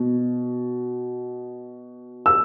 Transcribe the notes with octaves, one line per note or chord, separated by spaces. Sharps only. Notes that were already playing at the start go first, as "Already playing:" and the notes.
Already playing: B2
E6